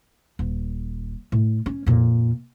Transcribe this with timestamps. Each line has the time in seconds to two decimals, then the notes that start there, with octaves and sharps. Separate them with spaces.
0.39 D#1
1.32 A2
1.66 C#4
1.86 F2 A#2